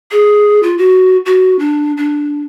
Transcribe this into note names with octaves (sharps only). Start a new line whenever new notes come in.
G#4
F4
F#4
F#4
D4
D4